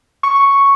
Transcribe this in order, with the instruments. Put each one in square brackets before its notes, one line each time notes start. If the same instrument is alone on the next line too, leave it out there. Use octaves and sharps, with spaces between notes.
[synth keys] C#6